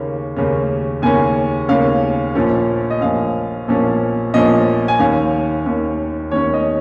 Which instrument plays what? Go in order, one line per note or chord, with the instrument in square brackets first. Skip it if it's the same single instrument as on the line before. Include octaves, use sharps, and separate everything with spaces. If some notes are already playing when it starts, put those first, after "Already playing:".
Already playing: [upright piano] D#2 C#3 A#3 C#4
D#2 C#3 A#3 C#4
D#2 C#3 A#3 C#4 G#5
D#2 C#3 A#3 C#4 F5
A#1 A#2 F3 C#4
D#5
A#1 A#2 F3 C#4 F5
A#1 A#2 F3 C#4
A#1 A#2 F3 C#4 D#5
G#5
D#2 D#3 C#4 F5
D#2 D#3 C#4
D#2 D#3 C#4 C#5
D#5